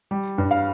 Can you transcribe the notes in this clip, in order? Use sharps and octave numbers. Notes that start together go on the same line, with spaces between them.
G3
G2
F5